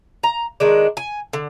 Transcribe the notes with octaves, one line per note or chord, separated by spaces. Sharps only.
A#5
D#3 G#3 D4
G#5
D3